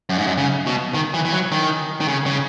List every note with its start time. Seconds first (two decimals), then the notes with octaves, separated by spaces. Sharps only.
0.09 F#2
0.18 G#2
0.27 F#2
0.38 C#3
0.67 B2
0.94 D#3
1.14 E3
1.25 E3
1.33 F#3
1.52 D#3
2.01 D#3
2.08 C#3
2.26 C#3